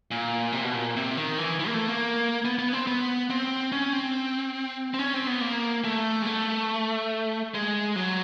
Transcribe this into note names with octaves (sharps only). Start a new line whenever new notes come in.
A#2
C3
B2
A#2
C3
D#3
E3
E3
A#3
A3
A#3
B3
B3
C4
B3
C4
C#4
C4
C4
C#4
C4
B3
A#3
A3
G#3
A3
G#3
F#3